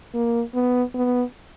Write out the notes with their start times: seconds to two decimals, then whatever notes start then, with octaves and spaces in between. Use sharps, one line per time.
0.14 A#3
0.55 B3
0.95 B3